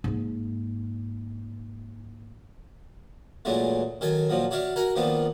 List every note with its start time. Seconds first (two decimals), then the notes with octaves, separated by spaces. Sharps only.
0.04 G#2 A#3
3.45 A#2 E3 F#3 G#3 A3
4.01 D#3 F#3 A4 G#5
4.30 A#2 F3 F#3
4.51 F#4 C#5 D5 E5 F5
4.76 F#4 A#4 F#5 G#5
4.96 D#3 F3 A#3 B3 D4